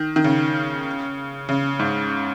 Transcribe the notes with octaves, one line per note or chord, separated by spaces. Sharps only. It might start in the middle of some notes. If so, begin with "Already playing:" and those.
Already playing: D#3
D#3
C#3
C#3
G#2